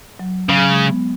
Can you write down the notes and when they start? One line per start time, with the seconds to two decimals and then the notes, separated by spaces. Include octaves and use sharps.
0.19 F#3
0.49 C#3 F#3
0.69 G#3
0.89 B3